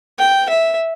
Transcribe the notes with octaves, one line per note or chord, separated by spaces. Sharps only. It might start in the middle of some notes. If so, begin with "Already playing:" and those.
G5
E5